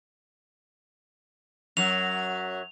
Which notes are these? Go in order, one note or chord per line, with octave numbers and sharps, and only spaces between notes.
F#2 F#3 F7